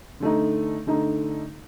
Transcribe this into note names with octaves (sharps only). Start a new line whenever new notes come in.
D3 A3 D#4
D3 A3 D#4